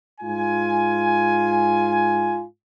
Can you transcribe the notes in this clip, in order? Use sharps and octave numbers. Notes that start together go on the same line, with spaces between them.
G#2 F4 G#5